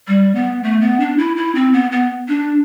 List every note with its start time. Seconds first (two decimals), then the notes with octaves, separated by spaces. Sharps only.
0.08 G3
0.35 B3
0.63 A3
0.81 B3
1.00 D4
1.18 E4
1.37 E4
1.55 C4
1.73 B3
1.92 B3
2.28 D4